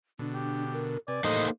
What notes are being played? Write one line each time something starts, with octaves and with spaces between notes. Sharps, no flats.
B2 D3 D4
G4
A#4
C3 B4 D5 G#5
A2 E3 A#3 D#4 A4 C5 D#5